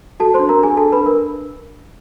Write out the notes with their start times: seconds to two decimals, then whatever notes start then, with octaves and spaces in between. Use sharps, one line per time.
0.20 F#4 A4 A5
0.34 C5 C6
0.39 D4
0.49 A#4 A#5
0.59 D4 G#4 G#5
0.77 D4 A4 A5
0.92 B4 B5
0.97 D4
1.06 A#4